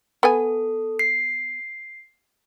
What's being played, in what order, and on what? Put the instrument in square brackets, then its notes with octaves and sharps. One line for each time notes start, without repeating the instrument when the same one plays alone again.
[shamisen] B3 G#5 [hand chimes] A4
[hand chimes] C7